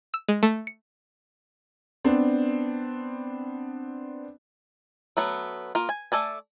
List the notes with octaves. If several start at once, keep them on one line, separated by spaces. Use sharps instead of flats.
E6
G#3
A3
C#7
B3 C4 D4
F#3 A3 B3
A#3 F4
G#5
A3 A4 D5 G#5